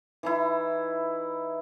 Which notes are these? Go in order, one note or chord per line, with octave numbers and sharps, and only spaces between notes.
E3 D#4 E4